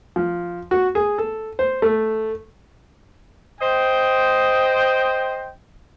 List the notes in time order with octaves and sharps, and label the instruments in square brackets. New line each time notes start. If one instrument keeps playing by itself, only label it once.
[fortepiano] F3
F#4
G#4
A4
C5
A3
[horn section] C5 D#5 G5